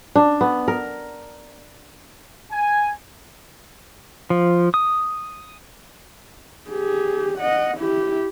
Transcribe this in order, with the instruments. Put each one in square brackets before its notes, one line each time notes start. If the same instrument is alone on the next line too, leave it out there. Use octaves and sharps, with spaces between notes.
[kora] D4
B3
A#4
[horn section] G#5
[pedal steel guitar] F3
D#6
[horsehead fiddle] G4 G#4
D#5 F#5
E4 G4